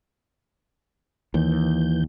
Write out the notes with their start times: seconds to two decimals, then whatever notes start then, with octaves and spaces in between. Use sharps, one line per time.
1.34 D#2 E3 G6